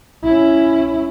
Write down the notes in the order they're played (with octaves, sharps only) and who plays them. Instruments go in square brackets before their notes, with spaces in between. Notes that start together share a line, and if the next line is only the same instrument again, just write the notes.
[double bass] C#4 E4